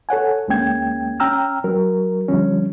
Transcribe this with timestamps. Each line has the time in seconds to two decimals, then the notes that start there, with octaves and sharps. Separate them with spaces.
0.09 A4 C#5 F#5 G#5
0.48 D2 G#3 A#3 C#4 G5 G#6
1.20 C#4 G5 A#5 E6 F6
1.64 F#3 A#4
2.28 D3 F3 G3 C#4